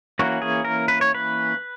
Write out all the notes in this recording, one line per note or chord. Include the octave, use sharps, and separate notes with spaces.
E3 A#3 C#4 F#4
G#4
A#4
B4
C#5
B4